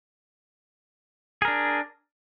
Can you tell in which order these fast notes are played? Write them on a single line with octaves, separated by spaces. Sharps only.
G#4 A#4 D4